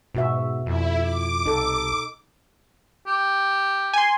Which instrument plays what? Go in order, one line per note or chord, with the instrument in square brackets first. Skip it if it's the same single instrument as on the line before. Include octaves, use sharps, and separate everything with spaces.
[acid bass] G#2 [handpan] B2 F#4 E5
[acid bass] F2 [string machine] E4
[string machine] D6
[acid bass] C2 [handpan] D#4 A4
[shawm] G4
[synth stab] G#5 C6